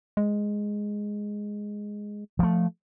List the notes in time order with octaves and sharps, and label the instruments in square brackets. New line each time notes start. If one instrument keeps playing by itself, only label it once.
[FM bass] G#3
[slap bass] F3 A3